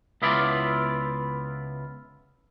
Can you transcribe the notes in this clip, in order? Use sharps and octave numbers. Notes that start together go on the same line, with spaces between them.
C#2 B3 E4 F4 D5